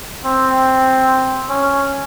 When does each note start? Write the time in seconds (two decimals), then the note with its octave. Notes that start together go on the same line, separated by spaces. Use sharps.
0.25 C4
1.50 C#4